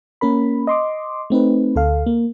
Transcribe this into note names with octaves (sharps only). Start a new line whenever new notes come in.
A#3 C#4 A#4 B5
D#5 C6 D6
A3 C4 D#4 B4
D2 A4 F5
A#3